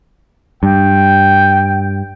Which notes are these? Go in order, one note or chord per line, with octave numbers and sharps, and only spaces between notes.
G2 G5